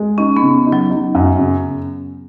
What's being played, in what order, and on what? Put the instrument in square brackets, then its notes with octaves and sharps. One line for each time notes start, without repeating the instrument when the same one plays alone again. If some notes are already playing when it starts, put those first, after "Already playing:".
Already playing: [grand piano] G#3
[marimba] C#4 [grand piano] D#4
[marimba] B3
[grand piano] C#3
D#4
[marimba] F#3
[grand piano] D#4
F#2
C#3